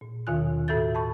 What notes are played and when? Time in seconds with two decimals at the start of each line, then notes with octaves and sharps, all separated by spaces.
0.01 A#2
0.27 D#2 B2 D#3 F4 G#5 F#6
0.68 A2 F#4 A4 E5 G6 A6
0.95 A5 B5 C#6